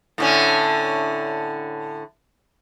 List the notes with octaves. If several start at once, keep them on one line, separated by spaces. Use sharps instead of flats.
A2 D3 C#4